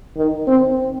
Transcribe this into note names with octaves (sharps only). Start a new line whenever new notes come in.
D#3
C4